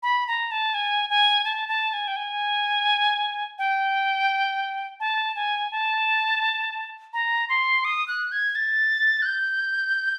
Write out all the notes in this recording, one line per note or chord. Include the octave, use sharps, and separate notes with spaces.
B5
A#5
A5
G#5
G#5
A5
A5
G#5
G5
G#5
G5
A5
G#5
A5
A#5
C6
D#6
F#6
G#6
A6
F#6
G6